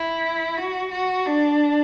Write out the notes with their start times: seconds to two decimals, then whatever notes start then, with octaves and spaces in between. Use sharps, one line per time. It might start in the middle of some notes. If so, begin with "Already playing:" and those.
Already playing: E4
0.57 F#4
0.91 F#4
1.26 D4